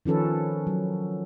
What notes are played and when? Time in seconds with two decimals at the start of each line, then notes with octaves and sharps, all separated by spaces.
0.06 D#3 F3 C#4 A4 B4
0.67 F#3